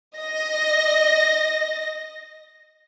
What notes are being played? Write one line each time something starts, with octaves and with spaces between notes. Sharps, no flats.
D#5 A#6